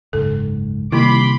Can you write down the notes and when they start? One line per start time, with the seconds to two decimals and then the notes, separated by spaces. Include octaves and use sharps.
0.13 F#1 C#2 G#2 A4
0.92 C3 D#3 G3 A#3 E4 B5 C6 D6